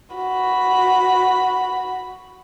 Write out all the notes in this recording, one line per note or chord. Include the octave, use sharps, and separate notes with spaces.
F#4 B5